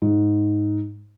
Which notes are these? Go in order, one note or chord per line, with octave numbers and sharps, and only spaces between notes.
G#2